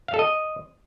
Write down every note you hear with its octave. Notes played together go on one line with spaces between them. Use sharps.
F5
A4
D#5